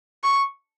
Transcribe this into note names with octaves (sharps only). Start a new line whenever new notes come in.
C#6